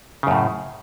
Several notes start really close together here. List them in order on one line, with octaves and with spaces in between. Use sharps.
C#3 F#2 A2